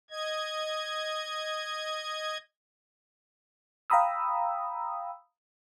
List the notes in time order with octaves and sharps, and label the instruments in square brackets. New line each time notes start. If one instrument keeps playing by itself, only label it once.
[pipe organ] D#5 G#6
[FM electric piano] F5 G5 A#5 B5 D#6 E6